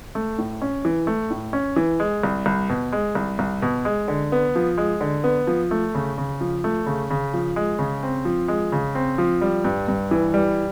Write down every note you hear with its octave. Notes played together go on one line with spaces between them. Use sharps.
A3
A2
C#4
E3
A3
A2
C#4
E3
G#3
C2
C2
B2
G#3
C2
C2
B2
G#3
D3
B3
F3
G#3
D3
B3
F3
A3
C#3
C#3
F3
A3
C#3
C#3
F3
G#3
C#3
C4
F3
G#3
C#3
C4
F3
G3
G2
G2
E3
G3